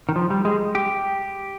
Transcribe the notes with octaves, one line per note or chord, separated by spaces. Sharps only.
D#3
F3
G3
G#3
G4